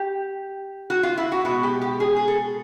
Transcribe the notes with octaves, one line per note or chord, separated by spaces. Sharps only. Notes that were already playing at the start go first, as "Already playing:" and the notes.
Already playing: G4
F#4
F4
E4
F#4
B2 G#3 F#4
G4
G4
G#4
G#4
A4